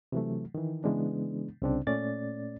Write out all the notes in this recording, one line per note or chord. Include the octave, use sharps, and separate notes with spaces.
C3 E3 F#3 A3
D#3 E3
C#3 E3 G#3 B3 D4
C2 C#3 C4 D4
A#2 A3 C#4 D5 A6